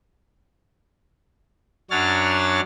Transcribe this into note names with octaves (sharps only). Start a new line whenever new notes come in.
F#2 F#3 D4 C#5 F6 A6